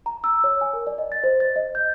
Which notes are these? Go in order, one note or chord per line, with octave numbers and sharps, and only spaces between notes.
A#5
E6
C#5
G#5
A#4
D5
D#5
A6
C5
A6
D#5
G6